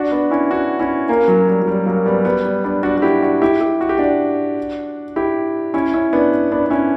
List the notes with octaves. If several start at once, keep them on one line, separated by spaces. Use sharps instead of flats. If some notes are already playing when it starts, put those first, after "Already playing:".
Already playing: D4 F#4
B3 D4
C#4 E4
D4 F#4
C#4 E4
A#3 C#4
F#3 A#3
G3
F#3
G3
F#3 A#3
G3 B3
G3 B3
G3
B3 D4
D4 F#4
F#4
E4 G4
D4 F#4
E4 G4
E4 G4
F#4
G4
D4 F#4
E4 G4
C#4 E4
C#4 E4
B3 D4
B3 D4
D4
C#4 E4